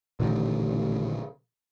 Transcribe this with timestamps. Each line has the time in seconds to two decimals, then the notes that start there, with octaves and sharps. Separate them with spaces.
0.20 A1 A#2 D3 D#3